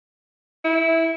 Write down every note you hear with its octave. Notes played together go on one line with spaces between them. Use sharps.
E4